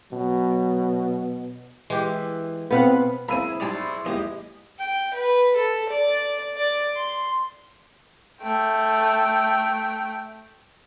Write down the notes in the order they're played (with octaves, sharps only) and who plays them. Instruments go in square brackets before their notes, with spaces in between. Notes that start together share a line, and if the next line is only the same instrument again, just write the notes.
[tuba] B2 [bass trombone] F#3
[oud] E3 [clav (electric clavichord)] G#3 G4
[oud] B2 B4 [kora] B3 F5 F#5 [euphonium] C4
[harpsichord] A#3 C4 [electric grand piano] E4 G#4 [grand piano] B5 E6 D#7
[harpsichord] D#4 G4 A5 [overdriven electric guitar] C5 D5
[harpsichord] D#2 [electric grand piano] G#3 E4 G4 [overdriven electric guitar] D#5
[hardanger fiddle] G5
B4
A4
D5
D5
C6
[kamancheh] A3 G5